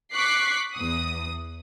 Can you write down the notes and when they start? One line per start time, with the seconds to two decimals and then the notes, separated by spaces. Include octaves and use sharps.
0.13 C#6 D6 F#6 B6 C7
0.75 E2 D#6